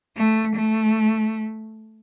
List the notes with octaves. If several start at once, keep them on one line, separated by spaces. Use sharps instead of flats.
A3
A3